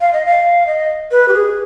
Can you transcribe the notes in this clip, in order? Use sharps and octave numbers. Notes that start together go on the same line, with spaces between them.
F5
D#5
F5
D#5
B4
G4
G#4